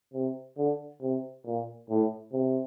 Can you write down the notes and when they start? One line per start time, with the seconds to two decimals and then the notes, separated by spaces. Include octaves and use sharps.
0.13 C3
0.57 D3
1.02 C3
1.45 A#2
1.89 A2
2.32 C3